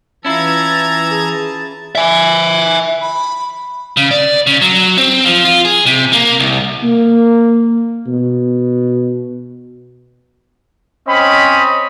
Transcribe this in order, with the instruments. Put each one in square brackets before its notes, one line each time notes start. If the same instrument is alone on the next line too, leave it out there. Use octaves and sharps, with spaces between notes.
[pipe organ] E3 A#5 G#6 [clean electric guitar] C#4 E4 F4 [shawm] A5 [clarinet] E6
[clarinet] G#4 [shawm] A5
[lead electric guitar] E5 G#5
[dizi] B5
[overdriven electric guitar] C#3
D5
C#3
F#3
C4
F3
F4
G#4
C3
A#3
C2
[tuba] A#3
B2
[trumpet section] C4 C#4 D#5 B5